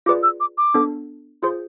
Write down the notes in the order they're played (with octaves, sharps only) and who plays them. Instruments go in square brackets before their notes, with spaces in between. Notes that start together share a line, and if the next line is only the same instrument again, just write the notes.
[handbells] F4 G#4 B4 D5 [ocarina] D6
[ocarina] E6
D6
D6
[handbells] B3 D4 A4
[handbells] F4 G#4 C5 [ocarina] C6